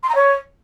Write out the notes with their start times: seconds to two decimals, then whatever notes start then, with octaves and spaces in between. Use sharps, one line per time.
0.03 C6
0.09 A#5
0.15 C#5